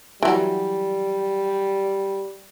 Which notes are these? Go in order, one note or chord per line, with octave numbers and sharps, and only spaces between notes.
E3 F#3 G3